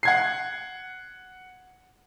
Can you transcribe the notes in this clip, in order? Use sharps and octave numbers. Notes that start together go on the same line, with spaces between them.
F#5 G#6 C7